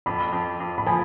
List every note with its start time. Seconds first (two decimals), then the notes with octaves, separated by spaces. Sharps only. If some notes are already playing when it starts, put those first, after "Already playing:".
0.06 F2 B5
0.33 F2
0.60 F2
0.78 B5
0.86 F3 G#5